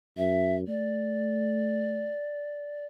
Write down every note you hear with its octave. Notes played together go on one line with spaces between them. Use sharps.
F#2 E5
A3 D5